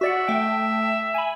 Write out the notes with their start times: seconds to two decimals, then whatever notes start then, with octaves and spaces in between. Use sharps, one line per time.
0.01 F#4 D5 E5 F#5
0.28 A3 G5
1.14 G#5 B5